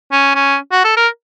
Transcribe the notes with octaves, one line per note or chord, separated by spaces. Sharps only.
C#4
C#4
F#4
A4
A#4